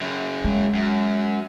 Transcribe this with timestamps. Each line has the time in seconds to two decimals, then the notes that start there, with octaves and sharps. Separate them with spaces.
0.01 F#2 C#3
0.45 G#3
0.75 F#2